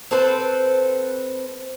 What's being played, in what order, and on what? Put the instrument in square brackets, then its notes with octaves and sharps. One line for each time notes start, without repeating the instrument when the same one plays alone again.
[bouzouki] C4 A4 B4 C5